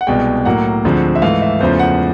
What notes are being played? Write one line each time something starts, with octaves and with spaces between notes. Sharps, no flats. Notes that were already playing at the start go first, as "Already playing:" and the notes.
F#5
C2 B2 G#3 G5
A2 F#3 A#3 F#5
D2 D3 F3 G#3 C4
E5
G#2 E3 A3 F5
E5
E2 C#3 F3 A3 C5
F#5